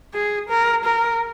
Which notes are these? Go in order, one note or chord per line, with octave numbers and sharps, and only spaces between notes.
G#4
A#4
A#4